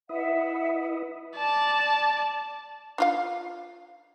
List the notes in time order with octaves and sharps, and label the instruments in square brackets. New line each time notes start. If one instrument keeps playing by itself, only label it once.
[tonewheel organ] E4 B4 D#5 [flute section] E5 F#5
[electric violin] D5 A5
[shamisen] D4 F4 F5